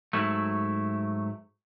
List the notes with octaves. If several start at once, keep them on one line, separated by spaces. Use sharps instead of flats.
G#2 F#3 A3 E4